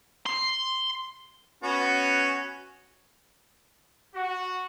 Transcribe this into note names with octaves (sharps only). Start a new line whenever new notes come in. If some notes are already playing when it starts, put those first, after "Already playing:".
C6
B3 C#4 F#4
F#4